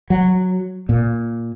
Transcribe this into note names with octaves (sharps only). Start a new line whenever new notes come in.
F#3
A#2